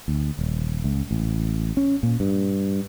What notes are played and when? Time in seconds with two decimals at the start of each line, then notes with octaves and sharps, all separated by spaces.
0.08 D2
0.39 D#1
0.84 C#2
1.11 A1
1.77 C#4
2.03 A#2
2.20 G2